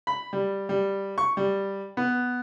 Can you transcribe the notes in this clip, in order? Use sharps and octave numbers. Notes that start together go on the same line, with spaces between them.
B5
G3
G3
C#6
G3
B3